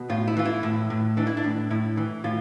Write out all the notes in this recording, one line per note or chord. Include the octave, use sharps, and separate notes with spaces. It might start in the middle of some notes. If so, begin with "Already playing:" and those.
Already playing: B2
A2 F4
E4
E3 F4
E4
A2
A2
E3 D4
E4
D4
A2
A2 E4
E3
A2 F4